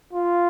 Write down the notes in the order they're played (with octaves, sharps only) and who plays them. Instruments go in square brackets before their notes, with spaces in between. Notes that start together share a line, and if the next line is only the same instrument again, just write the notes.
[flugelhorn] F4